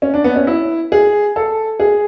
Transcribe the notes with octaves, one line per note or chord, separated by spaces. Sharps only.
C#4
D4
B3
C#4
E4
G#4
A4
G#4